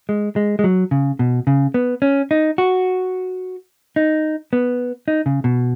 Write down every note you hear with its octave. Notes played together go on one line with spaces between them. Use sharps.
G#3
G#3
G#3
F#3
C#3
B2
C#3
B3
C#4
D#4
F#4
D#4
B3
D#4
C#3
B2